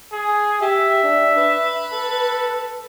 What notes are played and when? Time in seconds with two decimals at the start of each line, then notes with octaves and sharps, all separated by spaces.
0.12 G#4
0.61 G4 E5
1.03 D4
1.37 B4
1.93 A4